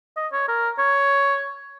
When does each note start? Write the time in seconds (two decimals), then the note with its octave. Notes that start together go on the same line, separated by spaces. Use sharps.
0.17 D#5
0.32 C#5
0.48 A#4
0.79 C#5